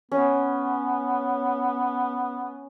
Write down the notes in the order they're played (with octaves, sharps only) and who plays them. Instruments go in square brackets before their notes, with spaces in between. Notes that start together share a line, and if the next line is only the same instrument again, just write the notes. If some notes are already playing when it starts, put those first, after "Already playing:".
[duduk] B3 [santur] C#4